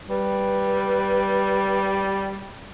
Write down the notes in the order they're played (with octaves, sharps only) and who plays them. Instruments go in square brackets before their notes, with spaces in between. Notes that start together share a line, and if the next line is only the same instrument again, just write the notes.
[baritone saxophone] G3 [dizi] B4